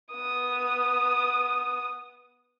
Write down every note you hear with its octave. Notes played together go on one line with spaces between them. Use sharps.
B3 D#6